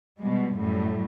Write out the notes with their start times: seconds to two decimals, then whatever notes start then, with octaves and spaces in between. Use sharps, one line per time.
0.18 B2 G3 G#3
0.56 F#2 A2 G3